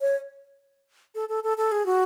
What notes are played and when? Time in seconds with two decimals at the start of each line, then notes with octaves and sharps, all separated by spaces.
0.01 C#5
1.15 A4
1.29 A4
1.44 A4
1.58 A4
1.72 G#4
1.86 F#4